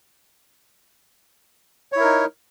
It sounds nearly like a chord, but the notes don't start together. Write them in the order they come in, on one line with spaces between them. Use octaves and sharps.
C#5 E4 A#4 D#4